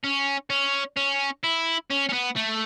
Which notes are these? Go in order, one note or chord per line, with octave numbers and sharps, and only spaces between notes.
C#4
C#4
C#4
E4
C#4
C#4
B3
A3